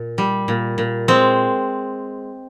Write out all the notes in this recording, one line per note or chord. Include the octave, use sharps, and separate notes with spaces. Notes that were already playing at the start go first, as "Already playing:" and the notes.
Already playing: A#2
G3
A#2
A#2
G#3 C4